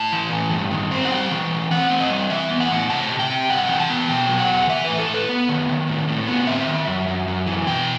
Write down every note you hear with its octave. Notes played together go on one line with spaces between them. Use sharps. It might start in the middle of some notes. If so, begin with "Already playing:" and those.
Already playing: A2 A5
E3
A2
G2
D#3
C4
F#5
G3 G5
E3
A2
C4 F#5
C4
D#5
G3
E3 E5
B3
F#5
A2
C3 A5
C3
G5
C3
G2 F#5
E3 G5
A5
B3
B2 G5
F#3
F#5
E2
E3 E5
A2 B4
A4
A2
B4
B3
D#3
D#3
A2
A2
B3
C4 E5
D#3
F#2
F#2
F#2
E3
B2 G5